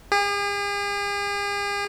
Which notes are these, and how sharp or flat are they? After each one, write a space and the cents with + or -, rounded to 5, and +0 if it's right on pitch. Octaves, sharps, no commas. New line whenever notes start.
G#4 -45